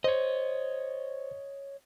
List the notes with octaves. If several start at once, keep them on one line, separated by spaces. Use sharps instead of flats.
C5 C#5 D#5